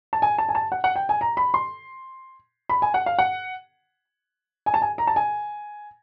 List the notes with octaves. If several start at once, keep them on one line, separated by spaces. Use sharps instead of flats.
A5
G#5
A5
G#5
A5
F#5
F#5
G5
G#5
A#5
B5
C6
B5
G#5
F#5
F5
F#5
G#5
A5
G#5
A#5
A5
G#5